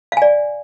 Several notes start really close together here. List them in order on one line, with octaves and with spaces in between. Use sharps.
F5 G#5 D5